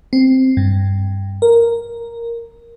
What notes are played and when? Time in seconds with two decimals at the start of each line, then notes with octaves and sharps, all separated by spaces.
0.13 C4
0.57 G2
1.42 A#4